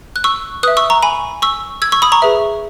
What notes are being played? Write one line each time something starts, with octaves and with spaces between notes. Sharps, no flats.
F#6
C#6 E6
B4 E5 D#6 F#6
C#6 E6
A#5 C#6
G#5 B5
C#6 E6
E6 G#6
C#6 E6
B5 D#6
A#5 C#6
G#4 B4 E5